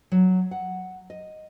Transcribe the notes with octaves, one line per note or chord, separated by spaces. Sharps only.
F#3
F#5
D#5